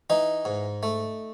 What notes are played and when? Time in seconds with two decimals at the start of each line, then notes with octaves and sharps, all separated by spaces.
0.10 E3 D#4
0.45 G#2
0.83 A3